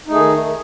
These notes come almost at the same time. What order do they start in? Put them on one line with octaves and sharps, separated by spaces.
D#4 A3 G#4 D#3